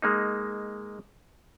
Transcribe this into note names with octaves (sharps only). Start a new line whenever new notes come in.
G#3 A#3 D#4